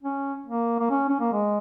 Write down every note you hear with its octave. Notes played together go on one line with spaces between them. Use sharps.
C#4
A#3
A#3
C#4
C#4
A#3
G#3